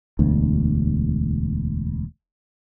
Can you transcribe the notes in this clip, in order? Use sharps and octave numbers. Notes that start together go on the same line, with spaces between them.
E1 D2